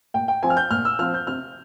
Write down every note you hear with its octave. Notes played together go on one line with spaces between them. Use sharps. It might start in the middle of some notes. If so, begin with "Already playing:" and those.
A#2 G5
G5
F3 C4 G#5
F6
G6
A#2 F6
E6
F3 C4 F6
G6
C3 F6